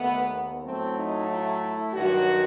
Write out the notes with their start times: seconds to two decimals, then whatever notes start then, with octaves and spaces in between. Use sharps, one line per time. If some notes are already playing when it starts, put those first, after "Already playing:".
Already playing: D#2 D#3 A3 B3
0.63 A2 F#3 A3 C4
0.95 D#4
1.28 E4
1.61 E4
1.93 G2 D#3 F#3 F#4